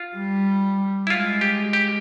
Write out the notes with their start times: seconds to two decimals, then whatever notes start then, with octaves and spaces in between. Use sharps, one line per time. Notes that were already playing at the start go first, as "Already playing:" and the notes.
Already playing: F4
0.17 G3
1.07 E4
1.10 G#3 F4
1.41 G4
1.73 G4